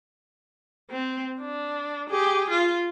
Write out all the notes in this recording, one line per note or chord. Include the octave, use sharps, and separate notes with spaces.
C4
D4
G4 G#4
F4